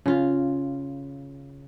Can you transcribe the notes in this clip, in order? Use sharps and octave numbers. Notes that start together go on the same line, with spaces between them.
C#3 F4